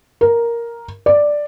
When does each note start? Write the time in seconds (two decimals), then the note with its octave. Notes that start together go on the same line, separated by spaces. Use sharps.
0.21 A#4
1.06 D5